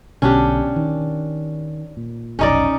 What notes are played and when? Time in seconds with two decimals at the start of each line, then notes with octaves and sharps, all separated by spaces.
0.22 B1 B2 D3 C#4 D4 G4
0.76 D#3
1.97 A#2
2.39 F1 B1 C#4 D#4 D5